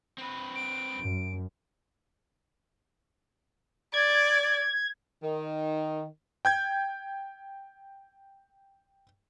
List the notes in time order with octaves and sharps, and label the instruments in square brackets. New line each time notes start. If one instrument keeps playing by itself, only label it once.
[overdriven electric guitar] C4 B4
[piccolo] D7
[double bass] F#2
[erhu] D5 [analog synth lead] G#6
[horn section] D#3
[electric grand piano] G5 G6 G#6